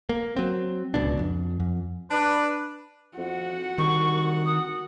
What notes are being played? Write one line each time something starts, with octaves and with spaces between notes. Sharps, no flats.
A#3
F#3 C4
D1 C#2 B2 D4
F2
F2
D4 B4
F2 F#4 F#5
C2 D#3 C#6
D#6